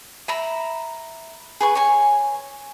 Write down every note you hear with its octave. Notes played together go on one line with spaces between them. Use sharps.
E5 A#5 B5
G#4 B4 C#6
C#5 G#5